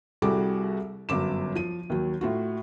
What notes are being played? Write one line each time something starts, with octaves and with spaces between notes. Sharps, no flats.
C2 G3 F#4 G#4 A4 D6
G1 F#2 D6 E7
F3 D#7
D#2 F#3
A2 F4 F#4